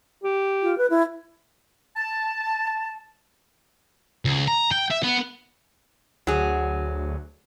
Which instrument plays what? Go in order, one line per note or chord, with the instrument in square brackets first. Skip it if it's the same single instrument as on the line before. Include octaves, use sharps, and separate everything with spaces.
[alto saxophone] G4
[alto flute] F4
B4
E4
[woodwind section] A5
[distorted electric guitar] C#2
A#5
G5
E5
B3
[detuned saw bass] D2 [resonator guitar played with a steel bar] F#3 G#4